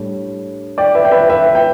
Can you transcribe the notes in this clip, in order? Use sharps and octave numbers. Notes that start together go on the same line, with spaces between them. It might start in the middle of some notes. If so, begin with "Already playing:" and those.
Already playing: A2 G3 D4
D5 G5
B4 E5
G5
B4 E5
B4 E5
E5
G5